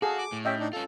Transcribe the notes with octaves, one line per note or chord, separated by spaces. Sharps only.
F#4 G#4 A4 F5
D6
A2
C#4 G4 D#5 E5 G5
D4 D#4
C#4 F4 A4